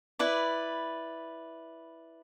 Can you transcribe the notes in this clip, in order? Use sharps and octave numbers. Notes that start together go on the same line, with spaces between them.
E4 B4 D5